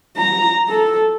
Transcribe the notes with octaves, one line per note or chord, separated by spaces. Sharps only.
A#5
A4